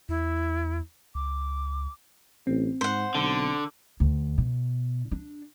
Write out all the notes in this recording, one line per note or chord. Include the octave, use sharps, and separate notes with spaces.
E2 E4
C#2 D6
A1 C4
G#2 C5 F#5
B1 D3
D2
B2
D4